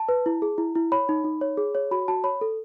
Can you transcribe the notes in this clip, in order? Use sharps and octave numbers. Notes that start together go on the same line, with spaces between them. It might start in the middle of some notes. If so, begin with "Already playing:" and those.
Already playing: A5
B4
E4
G#4
E4
E4
C#5 B5
D#4
D#4
C#5
G#4
C#5
F#4 B5
F#4 A5
C#5 B5
A4